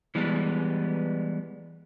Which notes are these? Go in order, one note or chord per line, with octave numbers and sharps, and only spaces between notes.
E3 G3 G#3 B3